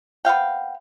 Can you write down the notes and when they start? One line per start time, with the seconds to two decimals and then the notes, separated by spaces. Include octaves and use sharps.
0.25 B3 C4 F5 G5